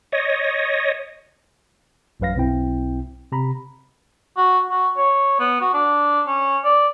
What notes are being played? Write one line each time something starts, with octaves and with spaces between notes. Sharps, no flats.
C#5 D#5
A1 F#2 F#3 B4 F5 A#6
B1 B2 C4 E4 G5
C3 A#5 B5
F#4
F#4
C#5
B3
F#4
D4
C#4
D5